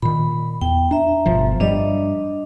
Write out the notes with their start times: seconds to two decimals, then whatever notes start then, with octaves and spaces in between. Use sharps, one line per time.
0.02 A#2 D#3 B5
0.61 E2 G5
0.91 D4 E5 A#5
1.26 G1 B2 F3
1.60 G2 F3 G3 D4 D#5